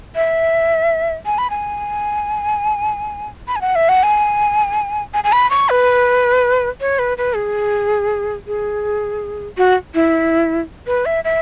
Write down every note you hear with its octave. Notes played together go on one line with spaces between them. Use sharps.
E5
G#5
B5
G#5
B5
G#5
F#5
E5
F#5
G#5
G#5
G#5
B5
C#6
B4
C#5
B4
B4
G#4
G#4
F#4
E4
B4
E5
E5